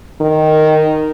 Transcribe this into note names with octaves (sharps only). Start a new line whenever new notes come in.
D#3